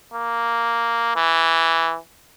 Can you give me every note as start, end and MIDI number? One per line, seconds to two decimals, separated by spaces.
0.13 1.12 58
1.16 1.96 52